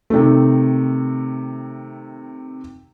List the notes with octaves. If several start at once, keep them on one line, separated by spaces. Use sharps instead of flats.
C3 D#3 A3